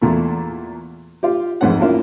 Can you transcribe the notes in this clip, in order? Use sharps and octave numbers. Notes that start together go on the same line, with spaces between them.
E2 A#2 A3
F4 G4
A#1 F2 G#2 C4 C5 F#5
A#3 C#4 D4 E4 F4 A#4